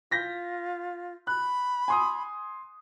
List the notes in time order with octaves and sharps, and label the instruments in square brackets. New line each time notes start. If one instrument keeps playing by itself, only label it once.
[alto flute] F4 [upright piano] G6 A#6 B6
[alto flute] B5 [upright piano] F#6
[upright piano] G#5 C6 D#6